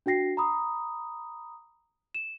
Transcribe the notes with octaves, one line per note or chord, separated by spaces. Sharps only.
D4 F#4 G5 A#6 C7
A#5 B5 D#6
E7